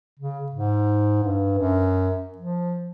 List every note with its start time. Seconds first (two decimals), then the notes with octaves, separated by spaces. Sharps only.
0.19 C#3
0.52 G#2
1.23 G2
1.58 F#2
2.38 F3